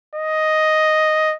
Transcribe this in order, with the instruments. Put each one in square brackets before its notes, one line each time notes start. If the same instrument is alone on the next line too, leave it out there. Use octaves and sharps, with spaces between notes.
[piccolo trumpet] D#5